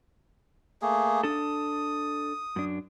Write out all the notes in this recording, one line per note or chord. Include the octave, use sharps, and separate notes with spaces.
A3 A#3 G#4
D4 A4 D#6
F#2 D4